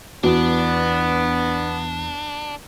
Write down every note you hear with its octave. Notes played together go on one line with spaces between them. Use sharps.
E2 B3 D4 F#4